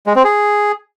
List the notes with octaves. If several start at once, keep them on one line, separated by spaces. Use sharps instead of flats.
G#3
C4
G#4